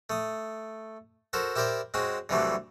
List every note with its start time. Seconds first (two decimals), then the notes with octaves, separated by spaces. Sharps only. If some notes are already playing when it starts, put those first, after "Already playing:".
0.10 A3 D#6
1.33 F#4 A4 A#4 C5
1.56 E4 G4 A#4 C5 D5
1.94 G#3 C4 C#4 F#4
2.29 C2 D3 E3 F#3 G3 A3